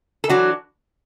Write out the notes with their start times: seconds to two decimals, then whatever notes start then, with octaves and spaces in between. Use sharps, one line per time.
0.24 A4
0.29 E3 F#3 D4 F#4